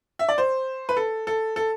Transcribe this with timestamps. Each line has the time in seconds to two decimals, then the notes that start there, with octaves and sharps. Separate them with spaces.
0.19 E5
0.29 D5
0.38 C5
0.89 B4
0.97 A4
1.27 A4
1.56 A4